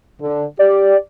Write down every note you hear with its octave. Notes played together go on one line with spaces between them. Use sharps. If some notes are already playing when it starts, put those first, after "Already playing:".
D3
G4 D5